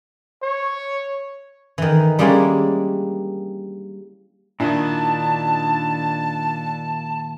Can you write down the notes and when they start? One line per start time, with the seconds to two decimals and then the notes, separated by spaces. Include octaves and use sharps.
0.43 C#5
1.78 D#3 E3
2.19 G3 G#3 A#3 C#4 D4 E4
4.60 A#2 D#3 D4 E4 A5